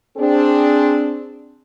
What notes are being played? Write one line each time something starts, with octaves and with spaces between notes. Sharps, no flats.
C4 D4 G#4